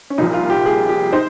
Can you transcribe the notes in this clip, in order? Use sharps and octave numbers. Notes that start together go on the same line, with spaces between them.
C#4
C2 A#2 F3 D#4
F4
G4
G#4
G4
D#4 C5